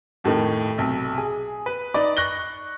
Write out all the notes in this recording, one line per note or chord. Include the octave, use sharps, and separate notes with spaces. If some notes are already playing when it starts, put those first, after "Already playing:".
F2 A2 D#3 A3
B1 C3
G#4
B4
D#4 D5 B5
C#6 F#6 A#6 G7